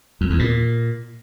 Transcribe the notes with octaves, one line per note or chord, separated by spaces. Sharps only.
F2
E2
A#2